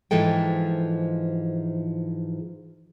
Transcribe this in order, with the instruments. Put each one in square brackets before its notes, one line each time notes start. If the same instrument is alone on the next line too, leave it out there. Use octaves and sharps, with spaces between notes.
[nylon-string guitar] G#2 E3 F3 G#3 A4 G5